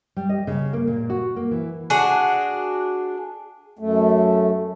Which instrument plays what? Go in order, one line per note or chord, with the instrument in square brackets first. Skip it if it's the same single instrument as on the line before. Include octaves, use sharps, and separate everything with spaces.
[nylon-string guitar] G3
D#5
C#3
A#3
A#2
F#4
A#3
E3
[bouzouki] D4 F#4 G#4
[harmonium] F#2 A3